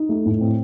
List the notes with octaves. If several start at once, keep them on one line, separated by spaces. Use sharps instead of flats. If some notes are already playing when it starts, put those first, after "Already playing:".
Already playing: D#4
A3
A2
C4